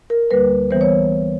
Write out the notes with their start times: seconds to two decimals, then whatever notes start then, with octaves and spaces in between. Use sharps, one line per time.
0.10 A#4
0.31 D2 D3 G3 A#3 B4
0.71 E3 G3 B3 C5
0.81 C#5